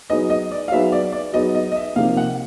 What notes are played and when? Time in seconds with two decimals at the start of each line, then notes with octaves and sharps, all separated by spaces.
0.10 F#3 B3 D#4 G#4 B4 D#5
0.30 D#5
0.51 D5
0.68 F5
0.72 F#3 B3 D#4 G#4 B4 E5
0.92 D5
1.13 D5
1.33 F#3 B3 D#4 G#4 B4 D#5
1.55 D#5
1.72 D#5
1.76 E5
1.96 C3 F3 A#3 D#4 G4 F5
2.17 F#5